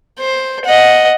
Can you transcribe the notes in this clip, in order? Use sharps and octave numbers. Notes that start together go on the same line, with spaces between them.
C5
D#5 F#5